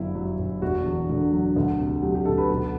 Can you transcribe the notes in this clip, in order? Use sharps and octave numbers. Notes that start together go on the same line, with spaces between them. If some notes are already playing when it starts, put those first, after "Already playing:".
Already playing: G1 F#2 E4
F#3
G1
E1 F#4
E2
D3
F#3
D2
C3
F#3 G4
G4
D2 A4
B4
B1